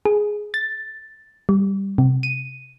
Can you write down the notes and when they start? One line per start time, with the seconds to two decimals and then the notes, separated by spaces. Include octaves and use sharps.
0.05 G#4
0.54 A6
1.49 G3
1.98 C3
2.23 D#7